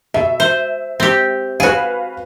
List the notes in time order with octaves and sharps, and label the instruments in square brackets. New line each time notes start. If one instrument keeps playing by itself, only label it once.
[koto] B2 [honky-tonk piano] E5
[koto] C5
C4 G4
[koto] F#4 G#4 [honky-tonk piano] B4 F5